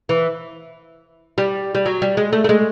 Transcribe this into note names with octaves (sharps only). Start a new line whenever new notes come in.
E3
G3
G3
F#3
G3
G#3
A3
A3
G#3